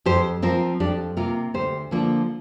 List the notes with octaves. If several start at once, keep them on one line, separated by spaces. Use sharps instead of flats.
F2 G4 C5
F3 C4 F4 A#4
F2 D4 G4
C3 A#3 F4 A#4
D2 G4 C5
D3 F3 A#3